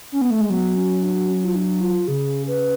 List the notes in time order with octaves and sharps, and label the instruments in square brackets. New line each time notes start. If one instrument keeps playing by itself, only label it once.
[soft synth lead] C#4
B3
A3
G#3
[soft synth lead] F#3 [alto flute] B3
[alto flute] C#4
D4
C#4
F4
D4
F4
[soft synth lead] C#3 [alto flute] G#4
[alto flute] B4